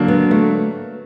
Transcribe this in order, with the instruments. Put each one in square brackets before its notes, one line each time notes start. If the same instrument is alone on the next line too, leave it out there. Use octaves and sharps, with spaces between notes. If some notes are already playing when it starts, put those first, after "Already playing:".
Already playing: [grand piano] D3 F#3 A#3 D4
[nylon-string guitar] B3
A3